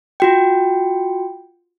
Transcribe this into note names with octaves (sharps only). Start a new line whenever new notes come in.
F4 F#4 G5